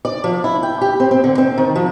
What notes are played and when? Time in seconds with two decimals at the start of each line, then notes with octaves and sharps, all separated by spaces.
0.05 D5
0.24 F3
0.44 E4
0.63 G5
0.81 G4
1.00 C4
1.11 C4
1.24 D3
1.38 C4
1.58 D#3
1.76 F3